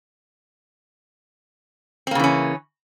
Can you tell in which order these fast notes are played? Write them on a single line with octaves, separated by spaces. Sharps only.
C4 A#3 C#3 E3 C#4